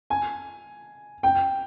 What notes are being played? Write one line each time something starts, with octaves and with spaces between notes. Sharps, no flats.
G#5
G5